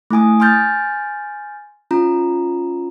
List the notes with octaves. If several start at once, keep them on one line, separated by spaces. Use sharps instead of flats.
A3 E4 G#5 D#6
G#5 C6 F6 G6 A6
C#4 F4 A#5